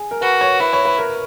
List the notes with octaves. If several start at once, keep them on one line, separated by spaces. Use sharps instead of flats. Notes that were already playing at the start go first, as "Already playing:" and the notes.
Already playing: G#4
A#4
F#4 B4
C#5
E4 B4
C#5
B4
A#4